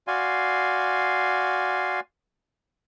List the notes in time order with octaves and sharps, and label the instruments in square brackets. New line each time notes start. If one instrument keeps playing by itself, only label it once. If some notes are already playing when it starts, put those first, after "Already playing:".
[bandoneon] F#4 D5 F5 G#5 C6